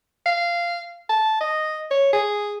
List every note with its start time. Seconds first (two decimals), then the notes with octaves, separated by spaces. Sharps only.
0.26 F5
1.09 A5
1.41 D#5
1.91 C#5
2.13 G#4